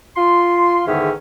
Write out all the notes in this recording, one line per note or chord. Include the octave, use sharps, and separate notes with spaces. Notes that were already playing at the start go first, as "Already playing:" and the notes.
F4 C6
E2 G#2 D3 D#3 C#4 E5